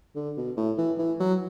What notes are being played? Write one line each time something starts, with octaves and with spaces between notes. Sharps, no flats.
D3
B2
A2
E3
E3
F#3